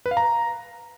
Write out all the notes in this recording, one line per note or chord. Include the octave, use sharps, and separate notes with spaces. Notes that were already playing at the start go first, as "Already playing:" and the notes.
B4
F5
A#5